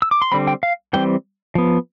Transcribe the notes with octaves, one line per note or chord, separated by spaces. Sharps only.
E6
D6
C6
D3 G3 C4 B5
G5
F5
E3 G3 C4 G5
F3 B3